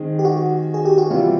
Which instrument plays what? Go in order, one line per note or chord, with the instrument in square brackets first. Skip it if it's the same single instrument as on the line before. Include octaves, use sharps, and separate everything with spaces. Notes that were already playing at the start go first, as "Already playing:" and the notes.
Already playing: [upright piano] D#3 G#3 C4 D#4 G#4
[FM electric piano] G4
F#4
G#4
G4
F#4
[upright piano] C3 E3 G3 B3 [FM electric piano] F4